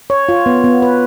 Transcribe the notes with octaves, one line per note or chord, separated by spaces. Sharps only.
C#5
F4
B3
B3
B4